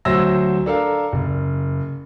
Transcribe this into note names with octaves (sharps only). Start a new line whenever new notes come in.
D2 F#3 C5 E5 E6 A#6
D4 A4 A#4 F5
F#1